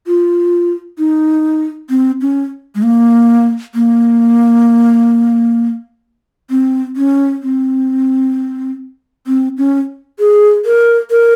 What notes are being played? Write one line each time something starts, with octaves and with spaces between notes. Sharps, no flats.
F4
D#4
C4
C#4
G#3
A#3
A#3
C4
C#4
C4
C4
C#4
G#4
A#4
A#4